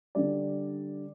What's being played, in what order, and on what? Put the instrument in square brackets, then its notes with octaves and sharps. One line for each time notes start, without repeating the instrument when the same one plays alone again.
[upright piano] D3 G3 D5